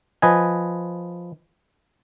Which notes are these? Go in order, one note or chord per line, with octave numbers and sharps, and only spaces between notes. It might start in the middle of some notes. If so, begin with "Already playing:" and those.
F3 B4 D#5 G#5